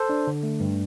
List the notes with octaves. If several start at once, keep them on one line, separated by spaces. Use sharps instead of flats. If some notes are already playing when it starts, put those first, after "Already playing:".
Already playing: A4 C5
D4
D3
A3
G2